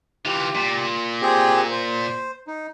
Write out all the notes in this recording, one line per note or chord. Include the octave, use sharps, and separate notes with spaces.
E3 F4 G4
A#2
C4 G4 G#4
C5
D#4